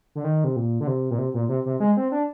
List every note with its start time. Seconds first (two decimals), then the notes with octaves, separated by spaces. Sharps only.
0.15 D3
0.24 D#3
0.44 C3
0.56 A#2
0.80 D3
0.87 C3
1.11 A#2
1.18 C3
1.34 A#2
1.49 C3
1.66 C3
1.80 G#3
1.97 C4
2.12 D4